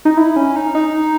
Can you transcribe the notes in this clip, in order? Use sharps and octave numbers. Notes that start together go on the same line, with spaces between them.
D#4
E4
C#4
D#4
D#4